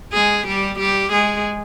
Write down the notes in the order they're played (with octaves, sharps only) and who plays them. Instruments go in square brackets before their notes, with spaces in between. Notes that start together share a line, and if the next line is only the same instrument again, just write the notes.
[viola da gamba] G#3 G#4
G3 G4
G3 G4
G#3 G#4